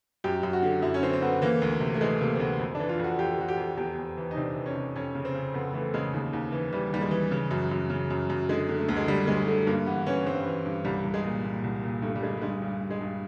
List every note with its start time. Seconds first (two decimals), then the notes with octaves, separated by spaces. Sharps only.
0.24 F#2 G4
0.43 F#2
0.53 F#4
0.63 D3
0.82 F#2 E4
0.94 C#4
1.02 D3 C4
1.13 C4
1.22 D3 B3
1.42 E3 A#3
1.62 D2
1.81 C3
1.94 A3
2.01 E3 G#3
2.21 C3 A#3
2.35 C4
2.40 D2 B3
2.59 F2
2.75 D4
2.80 E3
2.89 F4
2.99 F2 F#4
3.19 F2 G4
3.38 F2 F#4
3.48 G4
3.57 F2
3.77 E2 G4
3.98 E2
4.17 E3
4.31 D#4
4.36 C3 D4
4.56 E3
4.66 C#4
4.75 C3
4.96 F2 C#4
5.15 C#3
5.25 C4
5.34 C#3
5.54 F2 B3
5.73 E3 A3
5.94 C#3 G#3
6.13 D#2
6.33 D#2
6.52 E3
6.72 E3 G3
6.92 D#2 G3
7.01 G#3
7.11 E3
7.31 C#3
7.51 F#2
7.71 F#2
7.90 C#3
8.10 F#2
8.30 F#2
8.49 D3 G#3
8.69 D3
8.78 A3
8.89 D2
8.96 G#3
9.07 D3 G3
9.27 D2 G#3
9.47 D3 A3
9.67 G2 A#3
9.86 E3 B3
10.06 E3 C#4
10.25 G2 C4
10.45 E3
10.65 G2
10.85 C2 G3
11.05 C2
11.14 G#3
11.24 A#2
11.44 A#2
11.64 C2
11.83 A#2
12.02 G2 A3
12.16 G3
12.22 D3 G#3
12.37 G3
12.42 G2 G#3
12.62 G2
12.81 G2
12.91 G#3
13.01 G2